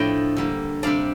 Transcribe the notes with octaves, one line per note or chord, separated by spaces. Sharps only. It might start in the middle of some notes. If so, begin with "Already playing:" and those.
Already playing: A2 F3 A3 D4 D#5 G5
D3 G3 A#3
C3 G3 D4 D5 F5